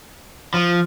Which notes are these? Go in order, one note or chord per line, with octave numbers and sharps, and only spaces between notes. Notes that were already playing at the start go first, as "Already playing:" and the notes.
F3